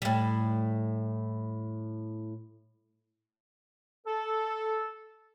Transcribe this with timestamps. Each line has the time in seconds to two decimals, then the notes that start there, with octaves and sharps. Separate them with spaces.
0.02 A2 G3
4.07 A4